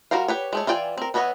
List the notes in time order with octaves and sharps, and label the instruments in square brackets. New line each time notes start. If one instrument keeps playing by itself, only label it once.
[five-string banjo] G3 F#4 A#4 C5 F5
G4 B4 C#5
G#3 A3 C#5
E3 F4 D5 G5 G#5
C4 A#4
E3 B3 C#5 D#5 F#5